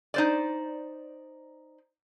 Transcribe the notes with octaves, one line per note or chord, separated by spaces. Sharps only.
D#4 C5 D5